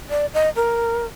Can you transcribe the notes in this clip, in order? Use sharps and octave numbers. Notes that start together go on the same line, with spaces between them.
D5
D#5
A#4